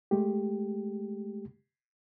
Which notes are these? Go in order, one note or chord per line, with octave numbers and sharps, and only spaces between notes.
G#3 A3 G4